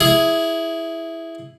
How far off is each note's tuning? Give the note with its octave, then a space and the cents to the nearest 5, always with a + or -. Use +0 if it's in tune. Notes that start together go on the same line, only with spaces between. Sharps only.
E4 +0 G#4 +0